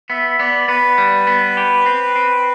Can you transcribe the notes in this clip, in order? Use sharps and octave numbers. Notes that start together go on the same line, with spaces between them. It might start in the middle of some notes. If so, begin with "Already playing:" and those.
B3 E5
B3 D5
B3 B4
G3
B3
G4
C4
C4